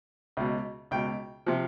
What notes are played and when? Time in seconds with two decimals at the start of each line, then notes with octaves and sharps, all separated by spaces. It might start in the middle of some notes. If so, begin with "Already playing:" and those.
0.37 C#2 B2
0.91 C#2 B2 G5
1.46 C3 F3